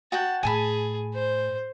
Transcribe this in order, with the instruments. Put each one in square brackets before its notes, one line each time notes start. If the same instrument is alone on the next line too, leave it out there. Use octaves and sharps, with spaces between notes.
[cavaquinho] F#4 F#5 G5 [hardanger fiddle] A5
[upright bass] A2 [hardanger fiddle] G#4 [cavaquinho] G#5 A5 B5
[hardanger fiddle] C5